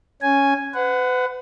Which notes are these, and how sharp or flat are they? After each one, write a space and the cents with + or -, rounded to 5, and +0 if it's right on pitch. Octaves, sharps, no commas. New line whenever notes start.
C#4 +0 G#5 +0
B4 +40 F#5 +0